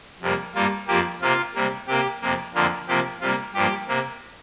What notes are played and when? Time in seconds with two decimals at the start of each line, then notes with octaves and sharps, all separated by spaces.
0.21 F2 C3 G3 A#3
0.55 G2 G3 A#3 F4
0.88 F2 F3 A#3 G4
1.21 C3 A#3 F4
1.55 C3 G3 A#3
1.88 C3 A#3 G4
2.22 F2 C3 A#3
2.54 F2 D3 F3 A#3 F4
2.88 C3 F3 A#3 G4
3.21 C3 G3 A#3 F4
3.54 G2 F3 A#3 G4
3.88 C3 A#3